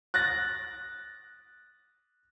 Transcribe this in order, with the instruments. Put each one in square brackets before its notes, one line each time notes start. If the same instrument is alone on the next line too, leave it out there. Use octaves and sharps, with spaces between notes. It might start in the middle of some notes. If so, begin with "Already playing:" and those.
[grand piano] F#6 A6 A#6